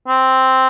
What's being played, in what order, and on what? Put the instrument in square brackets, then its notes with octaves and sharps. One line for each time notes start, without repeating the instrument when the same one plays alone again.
[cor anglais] C4